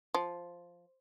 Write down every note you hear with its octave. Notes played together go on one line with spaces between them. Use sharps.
F3